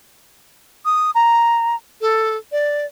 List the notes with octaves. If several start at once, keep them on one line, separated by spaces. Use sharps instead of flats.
D#6
A#5
A4
D5